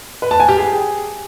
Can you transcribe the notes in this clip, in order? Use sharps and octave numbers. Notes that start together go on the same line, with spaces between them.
B4
A5
G#5
G4
G#4